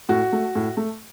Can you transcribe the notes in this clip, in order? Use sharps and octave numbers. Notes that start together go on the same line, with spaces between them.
A2 F#4
A3
A2
A3